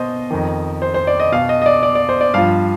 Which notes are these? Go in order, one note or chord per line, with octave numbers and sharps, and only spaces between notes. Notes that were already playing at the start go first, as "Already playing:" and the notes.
Already playing: B2 C5 D#5
F2 D#3
C5
C5
D5
D#5
B2 F5
D#5
D#5
D5
D5
D5
C5
D5
G2 F3 F5